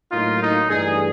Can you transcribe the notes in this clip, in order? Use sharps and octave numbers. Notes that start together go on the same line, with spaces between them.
A2 F#3 A#3 D#4 F4
D#4
G2 E3 A3 G#4